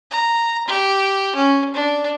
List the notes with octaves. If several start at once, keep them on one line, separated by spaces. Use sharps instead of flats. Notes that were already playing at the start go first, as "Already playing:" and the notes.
A#5
G4
C#4
D4